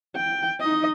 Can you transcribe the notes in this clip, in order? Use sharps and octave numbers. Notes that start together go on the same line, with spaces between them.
G5
D#4 D#5